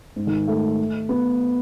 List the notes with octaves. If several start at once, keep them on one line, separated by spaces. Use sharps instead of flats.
G#2
D#3
A3
B3